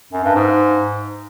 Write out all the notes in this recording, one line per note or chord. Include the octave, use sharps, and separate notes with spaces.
F#2
G2
G#2